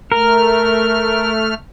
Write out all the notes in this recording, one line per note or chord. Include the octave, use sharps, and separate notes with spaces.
A3 A#4 F6